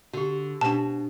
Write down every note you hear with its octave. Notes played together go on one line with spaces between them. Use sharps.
D3 F#4 G4
B2 D4 G4 C5 A5